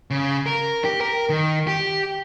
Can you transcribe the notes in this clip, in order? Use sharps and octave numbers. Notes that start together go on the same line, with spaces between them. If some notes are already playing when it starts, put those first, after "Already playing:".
C#3
A#4
G4
A#4
D#3
G4